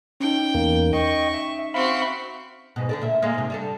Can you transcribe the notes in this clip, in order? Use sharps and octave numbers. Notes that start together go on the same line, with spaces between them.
C#4 D#4 G5
E2 A#3
D#5 G5 C#6
E5
C4 F#4 E5 F5 B5
G#2 B2
D3 A4 D5
A#2 E5
G#3 A#3
G#2 C3
G3 D4 A4